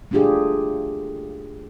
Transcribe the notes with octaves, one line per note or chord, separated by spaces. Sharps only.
A3 A#3 D4 F4 G4 G#4